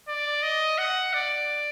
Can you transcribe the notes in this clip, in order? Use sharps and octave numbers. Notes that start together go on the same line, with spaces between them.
D5
D#5
F#5
D5